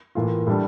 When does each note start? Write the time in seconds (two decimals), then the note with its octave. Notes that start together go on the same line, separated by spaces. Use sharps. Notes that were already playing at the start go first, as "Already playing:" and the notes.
0.15 A2 E3 A#3 F4
0.47 A2 G3 D4 A4